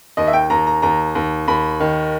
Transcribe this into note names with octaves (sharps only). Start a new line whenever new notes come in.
D#2 D#5
E5
G5
D#2 A#5
A#5
D#2 A#5
D#2
D#2 B5
D#3